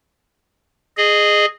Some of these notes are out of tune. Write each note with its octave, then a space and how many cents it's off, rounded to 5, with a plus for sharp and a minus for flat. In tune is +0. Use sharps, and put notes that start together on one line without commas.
G#4 +0 D#5 -25